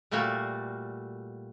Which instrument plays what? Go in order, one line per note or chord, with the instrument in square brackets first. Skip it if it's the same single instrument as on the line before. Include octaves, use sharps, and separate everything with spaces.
[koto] A#2 G3 A3 A#3 F#4 F5